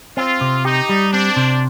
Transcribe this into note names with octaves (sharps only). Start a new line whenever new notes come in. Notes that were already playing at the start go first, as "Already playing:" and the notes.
C4 F4
C3
D#4 G4
G3
C4 D4
C3